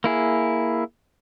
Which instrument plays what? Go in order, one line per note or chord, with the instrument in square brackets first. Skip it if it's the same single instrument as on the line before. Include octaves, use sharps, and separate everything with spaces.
[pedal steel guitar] A#3 E4 G#4